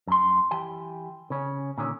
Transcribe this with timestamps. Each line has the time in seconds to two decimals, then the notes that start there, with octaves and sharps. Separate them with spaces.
0.08 F#2 C6
0.51 E3 G4 G5
1.30 C#3 C#4
1.78 A#2 D3 D#3 C#4